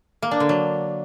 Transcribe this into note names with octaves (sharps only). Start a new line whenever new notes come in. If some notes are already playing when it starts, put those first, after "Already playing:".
A#3
D4
D3
F#3